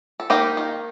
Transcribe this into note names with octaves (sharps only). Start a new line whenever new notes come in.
A4
A#3 D#4 G4
D#3